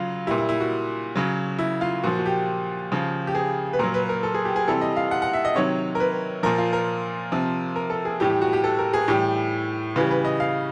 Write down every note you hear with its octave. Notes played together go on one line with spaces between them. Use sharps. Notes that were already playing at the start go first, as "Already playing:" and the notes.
Already playing: C#3 F#3 F4
A#2 G3 E4
E4
E4
F#4
C#3 F#3
E4
F4
A#2 F3 F#4
F#4
G4
C#3 F3
G4
G#4
B4
A#2 F#3 A#4
B4
A#4
A4
G#4
G4
G#4
C3 E3 G3 A4
D#5
F5
F#5
F#5
E5
D#5
C3 D#3 F#3 C#5
A#4
B4
A#2 F3 A#4
F4
A#4
C3 F3
A#4
A4
G#4
A2 E3 G3 G4
G4
F#4
G4
A4
A#4
G#4
A2 E3 G3 G4
C#3 E3 G3 B4
B4
D#5
F5